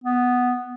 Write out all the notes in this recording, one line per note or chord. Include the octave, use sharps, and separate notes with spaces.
B3